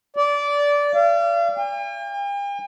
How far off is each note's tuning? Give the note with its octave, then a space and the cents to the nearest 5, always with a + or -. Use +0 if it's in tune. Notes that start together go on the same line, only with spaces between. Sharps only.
D5 -20
F5 -40
G5 +45